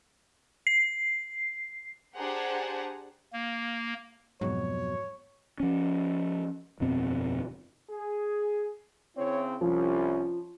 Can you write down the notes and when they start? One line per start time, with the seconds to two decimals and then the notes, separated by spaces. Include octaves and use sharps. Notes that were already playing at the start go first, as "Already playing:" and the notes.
0.67 C7
2.15 D4 G4 G#4 C5 F#5 A#5
3.33 A#3
4.41 F2 G#2 B2 F#3 C#5
5.60 F3 C#4
6.80 G1 F2 B2 C4
7.91 G#4
9.18 C#3 C4 E4 C#5
9.61 C2 F3 C#4